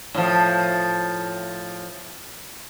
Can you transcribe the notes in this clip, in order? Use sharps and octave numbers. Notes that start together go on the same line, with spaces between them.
A2 F3